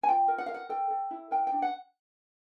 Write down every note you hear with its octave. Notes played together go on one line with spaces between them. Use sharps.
G#5
F4 G5
A#4
F#5
A#4 F5
F#5
A4 G5
A4
E4
A#4 G5
G5
D4
F#5